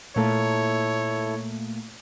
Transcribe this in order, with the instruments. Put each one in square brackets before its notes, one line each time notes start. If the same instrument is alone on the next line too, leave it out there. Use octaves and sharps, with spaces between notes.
[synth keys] A#2 A3 A#3 [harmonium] E4 A4 [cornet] C#5